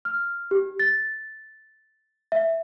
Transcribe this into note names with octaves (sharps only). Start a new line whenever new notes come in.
F6
G4
A6
E5